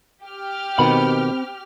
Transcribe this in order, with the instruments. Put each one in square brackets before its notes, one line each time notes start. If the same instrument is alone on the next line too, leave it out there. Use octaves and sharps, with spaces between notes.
[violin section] G4 F6
[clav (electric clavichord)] B2 D#3 [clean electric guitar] C4 B5